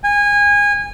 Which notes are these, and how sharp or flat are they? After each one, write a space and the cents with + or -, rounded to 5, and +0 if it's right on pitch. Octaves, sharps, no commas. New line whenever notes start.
G#5 -25